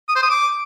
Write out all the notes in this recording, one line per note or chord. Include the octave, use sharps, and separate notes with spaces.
D#6
C5
D#6
D6